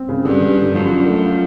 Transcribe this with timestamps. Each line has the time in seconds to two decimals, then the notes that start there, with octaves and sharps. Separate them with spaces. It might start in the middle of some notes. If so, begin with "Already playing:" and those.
Already playing: C4
0.09 C#3
0.25 G2 D3
0.41 D3
0.57 D3
0.73 F#2 F3
0.90 D4
1.06 A3
1.23 F4